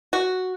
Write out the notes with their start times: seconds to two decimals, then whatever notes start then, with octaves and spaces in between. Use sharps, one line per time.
0.13 F#4